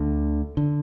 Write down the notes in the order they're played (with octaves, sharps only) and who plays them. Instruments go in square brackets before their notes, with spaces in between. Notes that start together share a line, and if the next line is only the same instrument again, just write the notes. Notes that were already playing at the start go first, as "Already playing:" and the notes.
Already playing: [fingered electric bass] D2 D3
D3